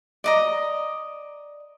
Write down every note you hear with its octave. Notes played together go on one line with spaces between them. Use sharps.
D5 D#5 A#5